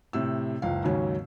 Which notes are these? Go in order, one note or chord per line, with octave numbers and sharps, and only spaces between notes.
A2 C3 E6
F#1 C#2 F5
D#2 G#2 C#3 F#3 C#4